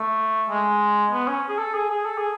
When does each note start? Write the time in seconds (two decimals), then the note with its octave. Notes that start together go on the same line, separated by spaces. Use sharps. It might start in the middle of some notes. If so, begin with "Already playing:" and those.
Already playing: A3
0.49 G#3
1.12 B3
1.27 C#4
1.48 G#4
1.58 A4
1.74 G#4
1.90 G#4
2.05 A4
2.18 G#4